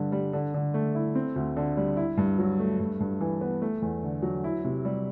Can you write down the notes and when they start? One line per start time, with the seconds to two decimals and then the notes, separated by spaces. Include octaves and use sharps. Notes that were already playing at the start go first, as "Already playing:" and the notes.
Already playing: G2 D3
0.12 G3
0.33 D3
0.54 D3
0.74 A3
0.95 E4
1.15 C4
1.36 D2
1.57 D3
1.77 G3
1.97 E4
2.17 G2
2.39 F#3
2.59 A3
2.79 G2
3.00 G2
3.21 E3
3.41 B3
3.62 A3
3.82 E2
4.03 D3
4.23 F#3
4.44 E4
4.64 C3
4.85 G3